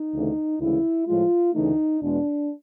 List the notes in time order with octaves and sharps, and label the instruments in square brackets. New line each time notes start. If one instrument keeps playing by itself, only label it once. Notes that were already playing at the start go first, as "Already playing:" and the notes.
Already playing: [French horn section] D#4
D2 C#3 E3 A3
D2 C#3 E3 G#3 E4
A2 F3 G#3 F4
D2 C#3 E3 A3 D#4
E2 B2 G#3 D4